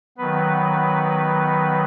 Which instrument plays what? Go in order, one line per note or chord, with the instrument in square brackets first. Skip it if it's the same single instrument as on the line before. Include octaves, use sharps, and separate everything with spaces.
[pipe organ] D#3 F#3 B3 B4